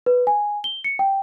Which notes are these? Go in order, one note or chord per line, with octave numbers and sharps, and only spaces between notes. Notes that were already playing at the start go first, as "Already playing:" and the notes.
B4
G#5
G7
C#7
G5